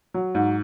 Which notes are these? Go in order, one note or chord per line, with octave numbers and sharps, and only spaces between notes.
F#3
G#2